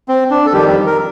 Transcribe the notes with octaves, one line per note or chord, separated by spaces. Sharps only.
C4
D4
A4
F2 D#3 G3 G4
A#4